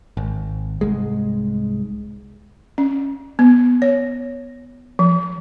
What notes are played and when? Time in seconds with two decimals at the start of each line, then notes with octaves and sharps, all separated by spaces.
0.17 G#1
0.81 C2 G#2 G#3
2.78 C#4
3.39 B3
3.82 C#5
4.99 F3